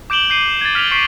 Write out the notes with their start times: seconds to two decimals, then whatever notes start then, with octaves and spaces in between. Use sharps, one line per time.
0.10 D6 G6 D7 E7 F#7 G7
0.30 G6 C7 D#7
0.61 G#6 A6
0.75 F6 B6 D7 F7 G7
0.91 C#6 G6 B6 C7 D7 D#7